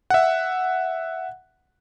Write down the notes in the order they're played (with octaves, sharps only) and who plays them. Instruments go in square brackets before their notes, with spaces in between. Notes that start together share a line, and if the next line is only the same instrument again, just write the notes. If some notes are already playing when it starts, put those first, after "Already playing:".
[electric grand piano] E5 F#5